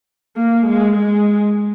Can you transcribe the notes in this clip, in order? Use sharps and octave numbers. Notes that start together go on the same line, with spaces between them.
A#3
G#3
G#3